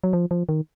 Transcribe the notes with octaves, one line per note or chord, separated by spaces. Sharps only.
F#3
F3
F3
D#3